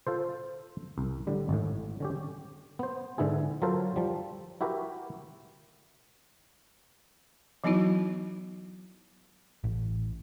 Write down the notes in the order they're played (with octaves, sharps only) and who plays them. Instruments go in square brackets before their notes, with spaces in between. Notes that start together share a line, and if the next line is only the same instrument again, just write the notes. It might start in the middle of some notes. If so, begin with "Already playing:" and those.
[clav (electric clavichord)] F4 A4 C5
C2
A2 D3 G3
G#1 A2
D3 C#4 G4
B3 C5
G#2 D3 B3 E4 G#4
F#3 F4 A4 A#4 C5
F3 G3
E4 F#4 G4 A#4 B4
[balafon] E3 F#3 B3 D#4 E4 F#4
[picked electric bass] A1